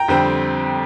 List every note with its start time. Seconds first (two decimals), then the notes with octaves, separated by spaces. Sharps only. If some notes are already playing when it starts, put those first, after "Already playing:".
Already playing: G5 A#5
0.08 F2 D3 G3 C4